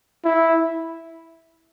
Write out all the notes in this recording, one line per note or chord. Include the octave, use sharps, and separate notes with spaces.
E4